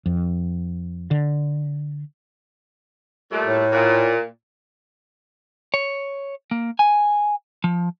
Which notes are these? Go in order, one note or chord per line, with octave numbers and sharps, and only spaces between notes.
F2
D3
A#2 G3 A3
A2
A#2
C#5
A#3
G#5
F3